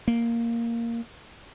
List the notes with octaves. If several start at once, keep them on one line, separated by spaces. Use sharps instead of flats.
A#3